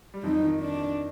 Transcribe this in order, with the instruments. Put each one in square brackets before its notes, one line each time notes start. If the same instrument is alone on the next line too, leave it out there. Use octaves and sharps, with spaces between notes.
[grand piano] G3
[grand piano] F2 F3 [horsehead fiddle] D#4
[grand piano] D#3
[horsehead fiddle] D4